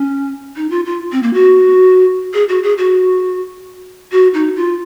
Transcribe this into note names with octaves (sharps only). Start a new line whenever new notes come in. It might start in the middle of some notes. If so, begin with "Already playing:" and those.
Already playing: C#4
D#4
F4
F4
C4
A#3
F#4
G#4
F#4
G#4
F#4
F#4
D#4
F4